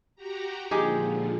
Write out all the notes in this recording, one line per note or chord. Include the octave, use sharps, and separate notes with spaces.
F#4 G4 A#5
A#2 D3 F3 G#3 D#4 G4